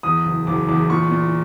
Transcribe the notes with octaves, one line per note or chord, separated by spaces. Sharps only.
E2 D#6
F#1
F#1 D6
E2 D6
A#2 C#6
A#2